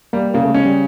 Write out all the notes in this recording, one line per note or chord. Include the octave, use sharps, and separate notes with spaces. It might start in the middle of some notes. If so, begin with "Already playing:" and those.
G3 A#3
C#3 A#3
A3
G#3 C#4
G3